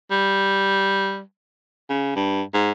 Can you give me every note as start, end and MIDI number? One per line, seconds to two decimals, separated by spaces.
0.11 1.20 55
1.90 2.11 49
2.16 2.42 43
2.54 2.72 44